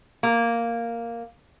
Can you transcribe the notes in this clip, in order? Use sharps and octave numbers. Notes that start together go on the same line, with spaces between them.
A#3